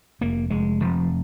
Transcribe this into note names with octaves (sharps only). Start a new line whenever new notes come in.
F1 A#3
F1 G#3
F1 F3